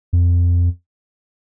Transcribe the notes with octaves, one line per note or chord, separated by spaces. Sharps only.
F2